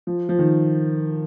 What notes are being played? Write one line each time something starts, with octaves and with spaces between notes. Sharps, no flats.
F3
F3
D#3